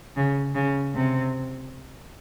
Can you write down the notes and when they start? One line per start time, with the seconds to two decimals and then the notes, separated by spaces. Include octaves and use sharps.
0.16 C#3
0.55 C#3
0.95 C3